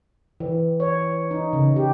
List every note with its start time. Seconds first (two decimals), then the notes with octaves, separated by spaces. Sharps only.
0.40 E3
0.80 C#5
1.31 D#4
1.53 C#3
1.76 G4